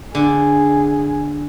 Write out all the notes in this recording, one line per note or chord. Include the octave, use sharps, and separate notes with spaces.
D3 G#4